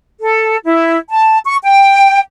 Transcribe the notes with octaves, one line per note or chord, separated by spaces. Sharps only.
A4
E4
A5
C#6
G5